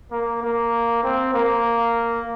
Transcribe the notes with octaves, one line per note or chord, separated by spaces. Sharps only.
A#3
A#3
C4
A#3